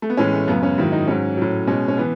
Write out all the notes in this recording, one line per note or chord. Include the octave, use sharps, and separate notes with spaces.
A3
B3
A2 E3 G#3 C#4
A3
F#2 C#3 G#3 B3
C#4
G#2 D#3 F#3 E4
D#4
G#2 F#3 C#4
A2 F#3
B2 G#3 C#4
C#4
E3 B3